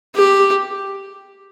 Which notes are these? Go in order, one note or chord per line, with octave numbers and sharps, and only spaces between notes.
G4